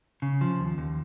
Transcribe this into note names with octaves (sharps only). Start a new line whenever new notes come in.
C#3
F3
D#2
D#2